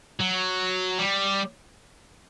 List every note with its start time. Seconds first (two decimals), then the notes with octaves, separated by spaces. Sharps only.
0.20 F#3
0.99 G3